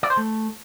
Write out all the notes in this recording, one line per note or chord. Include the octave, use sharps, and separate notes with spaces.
D5
C5
A3